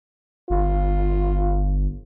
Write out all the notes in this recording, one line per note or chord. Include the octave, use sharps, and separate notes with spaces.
G1 F4